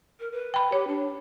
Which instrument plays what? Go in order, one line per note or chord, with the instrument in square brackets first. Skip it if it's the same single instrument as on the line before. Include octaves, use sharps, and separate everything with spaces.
[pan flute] A#4
B4
[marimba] G5 B5
[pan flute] G4 [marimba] C#5
[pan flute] D4